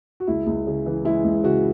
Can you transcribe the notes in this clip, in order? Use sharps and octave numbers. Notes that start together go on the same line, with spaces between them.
F#4
C#2 E4
C#2
C#3
E3
G#3 E4
C#2
C#3 F#4